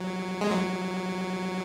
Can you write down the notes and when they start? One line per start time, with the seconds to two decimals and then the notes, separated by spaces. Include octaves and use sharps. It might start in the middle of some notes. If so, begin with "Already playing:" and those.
Already playing: F#3
0.41 G#3
0.51 F#3